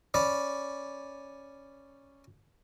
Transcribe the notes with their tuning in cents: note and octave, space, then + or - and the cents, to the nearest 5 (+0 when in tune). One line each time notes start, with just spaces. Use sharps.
C#4 -5 D5 +0 B5 -10